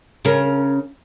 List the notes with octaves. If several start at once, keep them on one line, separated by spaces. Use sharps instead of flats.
C#3 C#4 A#4